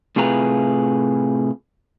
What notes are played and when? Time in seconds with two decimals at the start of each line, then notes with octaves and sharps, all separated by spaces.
0.16 A2 C3 F4 G#4 B4 A#5